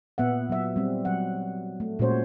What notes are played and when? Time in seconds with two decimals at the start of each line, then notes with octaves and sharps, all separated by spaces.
0.18 A#2 B3 E5 F#5
0.50 F#3 E5
0.76 G3 C4
1.05 F#3 F#5
1.80 A3
1.99 A#2 G#3 C#4 F#4 C5 C#5